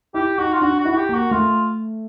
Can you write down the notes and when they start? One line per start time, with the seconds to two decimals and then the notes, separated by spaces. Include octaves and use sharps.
0.14 E4 G4
0.38 D#4 F#4
0.53 F4
0.61 D4 F#4
0.79 F#4
0.85 E4
0.91 F#4
0.96 G4
1.09 A#3 F#4
1.31 A3 F4